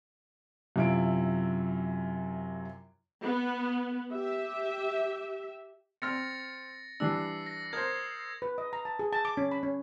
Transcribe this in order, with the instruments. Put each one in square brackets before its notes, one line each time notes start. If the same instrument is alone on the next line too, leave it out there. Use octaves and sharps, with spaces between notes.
[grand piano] F#2 C3 E4 F4 D7
[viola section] B3
G4 E5
[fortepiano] C4 F6 [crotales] A6 A#6 C#7
[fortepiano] E3 G3 D4 [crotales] E6 C7
[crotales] A#6
[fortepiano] A#4 C5 [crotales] D#6 G#6
[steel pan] B4
D#5
A#5
A5
G#4
A5
D6
C#4
B5
C#4